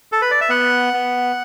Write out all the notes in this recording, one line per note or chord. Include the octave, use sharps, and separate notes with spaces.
A4
B4
D5
E5
B3 F#5
B3